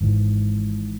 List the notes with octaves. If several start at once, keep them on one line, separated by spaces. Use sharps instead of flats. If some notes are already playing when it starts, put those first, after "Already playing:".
G#1 G#2 E3